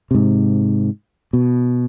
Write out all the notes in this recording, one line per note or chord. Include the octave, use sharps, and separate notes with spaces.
G#2 C3
B2